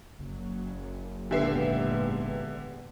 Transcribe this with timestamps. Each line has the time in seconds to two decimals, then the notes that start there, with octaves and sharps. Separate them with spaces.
0.19 F#1 F#3
1.31 G#1 E2 A#2 D3 B3 G4 E5 C7